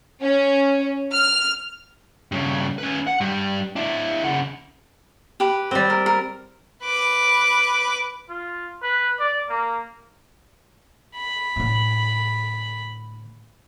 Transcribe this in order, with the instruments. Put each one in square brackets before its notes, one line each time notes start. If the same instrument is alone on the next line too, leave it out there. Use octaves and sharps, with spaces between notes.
[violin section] C#4
F6
[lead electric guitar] G2 C#3
C#4 B4
F#5
G2 G3
D4 E4
C#3 F#5
[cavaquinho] G4 B4
[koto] G3 C4
[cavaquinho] A#4
A#4
[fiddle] B4 D6
[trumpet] F4
B4
D5
A#3
[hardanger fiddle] B5
[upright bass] A2 D3